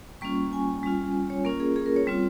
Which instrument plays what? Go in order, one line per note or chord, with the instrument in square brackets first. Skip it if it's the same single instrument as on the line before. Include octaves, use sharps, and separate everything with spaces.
[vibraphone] G3 A#3 C#4 F4 C#6
G#5
G3 C#4 F4
C#5
A#3 C#4 F4 A#4
G#4
G#4
A#4
C#5
G3 C4 F4